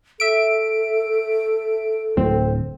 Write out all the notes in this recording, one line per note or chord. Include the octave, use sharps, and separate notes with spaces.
A4 E5 D7
D1 C4